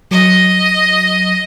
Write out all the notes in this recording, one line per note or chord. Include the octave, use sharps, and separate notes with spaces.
F#3 D#5